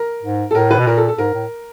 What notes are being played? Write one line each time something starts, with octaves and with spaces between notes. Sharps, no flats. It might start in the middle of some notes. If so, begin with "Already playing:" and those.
Already playing: A#4
G#2
A4
A2 A#4
B4
B2
A#2 A#4
A4
A4
G#2 A#4
A2